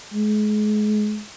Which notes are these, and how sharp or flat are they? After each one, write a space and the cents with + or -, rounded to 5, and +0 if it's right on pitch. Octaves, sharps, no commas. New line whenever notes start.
G#3 +30